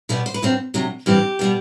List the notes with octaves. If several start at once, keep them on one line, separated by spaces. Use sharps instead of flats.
B2 G3 B3 D5
C5
B4
G2 F#3 C4
D2 C3 F#3
G2 E3 G3 C4 G4
B2 G3 B3